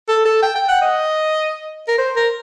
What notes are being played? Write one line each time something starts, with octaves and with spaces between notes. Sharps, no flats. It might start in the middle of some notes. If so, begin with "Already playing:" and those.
A4
A4
G5
G5
F#5
D#5
A#4
C5
A#4